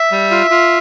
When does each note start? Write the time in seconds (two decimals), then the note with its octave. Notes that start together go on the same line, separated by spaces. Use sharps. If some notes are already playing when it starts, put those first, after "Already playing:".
Already playing: E5
0.12 G3
0.31 F4
0.51 F4